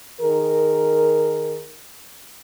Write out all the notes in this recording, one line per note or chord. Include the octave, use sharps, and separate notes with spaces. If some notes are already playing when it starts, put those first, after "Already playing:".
D#3 G#4 A#4